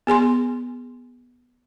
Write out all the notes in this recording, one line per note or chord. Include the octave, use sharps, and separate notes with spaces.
B3 G#4 G#5 C6